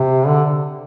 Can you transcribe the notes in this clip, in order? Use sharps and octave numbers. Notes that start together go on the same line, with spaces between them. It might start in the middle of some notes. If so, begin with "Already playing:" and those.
Already playing: C3
D3